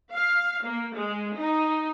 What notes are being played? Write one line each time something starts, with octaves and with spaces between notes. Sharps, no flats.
F5
A#3
G#3
D#4